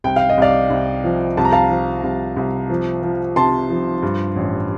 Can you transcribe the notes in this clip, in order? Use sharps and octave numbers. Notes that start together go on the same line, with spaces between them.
C2 G5
F5
D#5
C2 D5 F5
C2
F3
C2 A5
A#5
F5 A5
F3
C2
C2
F3
F3
C3 A5 C6
F3
G2
A1